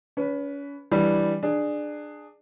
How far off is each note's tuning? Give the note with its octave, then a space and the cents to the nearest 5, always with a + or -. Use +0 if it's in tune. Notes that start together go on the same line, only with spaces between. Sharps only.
C#4 +35 B4 +0
E3 +0 G3 +0 D4 +0
D4 +20 G#4 +0